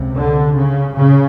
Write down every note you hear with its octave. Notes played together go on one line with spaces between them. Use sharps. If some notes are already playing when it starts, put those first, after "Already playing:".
Already playing: C#2 C3
D3
C#3
C#3